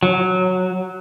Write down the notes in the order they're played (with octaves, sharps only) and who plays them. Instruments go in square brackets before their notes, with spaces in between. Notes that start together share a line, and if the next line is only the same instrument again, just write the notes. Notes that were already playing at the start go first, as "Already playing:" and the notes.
[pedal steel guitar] F#3